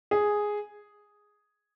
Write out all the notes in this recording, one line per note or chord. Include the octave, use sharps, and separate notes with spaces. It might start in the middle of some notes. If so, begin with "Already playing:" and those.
G#4